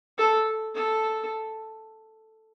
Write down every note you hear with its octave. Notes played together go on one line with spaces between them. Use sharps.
A4
A4